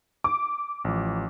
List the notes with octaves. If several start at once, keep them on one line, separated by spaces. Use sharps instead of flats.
D6
A1 F3